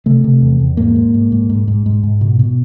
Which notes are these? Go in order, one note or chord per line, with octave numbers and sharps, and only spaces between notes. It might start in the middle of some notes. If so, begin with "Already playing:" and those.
C3 A3
C3
E2
E2
G#2 A#3
G#2
G#2
G#2
G#2
G#2
G#2
G#2
B2
B2